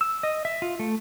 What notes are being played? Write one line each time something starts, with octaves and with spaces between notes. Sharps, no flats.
E6
D#5
E5
F4
A3